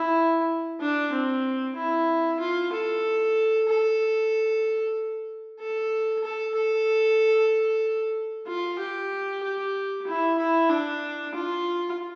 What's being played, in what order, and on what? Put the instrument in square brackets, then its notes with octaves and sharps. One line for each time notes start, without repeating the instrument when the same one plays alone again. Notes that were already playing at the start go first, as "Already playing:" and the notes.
Already playing: [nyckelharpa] E4
D4
C4
E4
F4
A4
A4
A4
A4
A4
F4
G4
G4
E4
E4
D4
F4